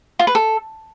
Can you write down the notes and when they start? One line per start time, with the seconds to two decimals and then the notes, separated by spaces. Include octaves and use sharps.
0.19 F4
0.27 B4
0.35 A4